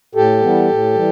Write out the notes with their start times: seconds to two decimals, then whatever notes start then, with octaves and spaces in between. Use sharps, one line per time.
0.15 A2 G4 A4
0.42 E3 G3 B3
0.68 A2
0.94 E3 G3